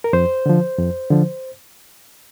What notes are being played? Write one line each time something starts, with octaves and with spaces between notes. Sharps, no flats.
A#4
F2 C5
D3 F3
F2
D3 F3